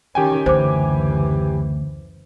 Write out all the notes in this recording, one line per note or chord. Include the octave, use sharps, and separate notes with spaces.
D#3 C#4 G4 G5 G#5
F#1 D2 E3 C5 D6